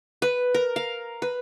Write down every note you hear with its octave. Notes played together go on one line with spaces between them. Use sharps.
B4
A#4
F5
B4